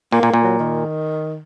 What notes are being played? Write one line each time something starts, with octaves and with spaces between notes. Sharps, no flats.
A#2 A#3
A#2
A#2
F#3
D#3